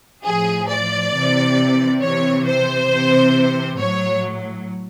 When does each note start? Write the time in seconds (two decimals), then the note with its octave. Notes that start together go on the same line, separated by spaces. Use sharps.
0.24 A2 F3 G#4
0.69 D5
1.13 C3 E3
2.02 C3 E3 C#5
2.46 C5
2.91 C3 E3
3.79 A2 F#3 C#5